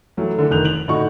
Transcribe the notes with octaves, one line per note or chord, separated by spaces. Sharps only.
E3 F#3 A3
D3 E3 A3
F1 D#3 F#6 G6 F7
F7 F#7
A2 D3 D#4 F#4 C#6